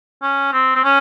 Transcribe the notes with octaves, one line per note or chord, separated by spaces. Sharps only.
C#4
C4
C4
C#4